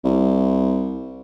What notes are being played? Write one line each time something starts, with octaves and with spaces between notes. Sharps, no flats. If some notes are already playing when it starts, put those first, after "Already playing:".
C2